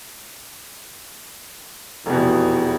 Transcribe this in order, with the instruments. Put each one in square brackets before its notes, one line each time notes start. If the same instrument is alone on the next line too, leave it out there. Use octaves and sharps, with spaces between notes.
[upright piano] F1 B2 [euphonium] E2